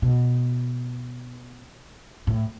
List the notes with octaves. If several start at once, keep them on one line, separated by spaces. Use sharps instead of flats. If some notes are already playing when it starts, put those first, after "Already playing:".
B2
A2